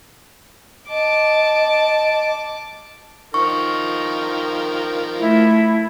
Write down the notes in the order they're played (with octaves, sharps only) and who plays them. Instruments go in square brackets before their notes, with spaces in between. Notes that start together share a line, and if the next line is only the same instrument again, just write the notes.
[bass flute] D#5 [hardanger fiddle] A5 D6
[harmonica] D#3 F3 A#4 [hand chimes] C#6
[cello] A3 [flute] E4